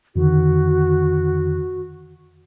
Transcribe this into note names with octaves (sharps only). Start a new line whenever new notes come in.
F2 D3 D#3 F#4